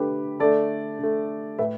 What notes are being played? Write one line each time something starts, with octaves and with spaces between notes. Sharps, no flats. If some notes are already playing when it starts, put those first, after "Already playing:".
Already playing: D3 A3 G4 B4
D3 A3 A4 D5
D3 A3
A2 A3 B4 E5